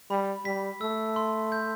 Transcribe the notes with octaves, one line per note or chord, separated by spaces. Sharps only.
G3 B5
G3 B6
A3 E6
C6
G6